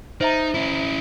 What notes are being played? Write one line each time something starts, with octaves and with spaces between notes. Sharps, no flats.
D#4 C5 E5 A#5
C#4 E4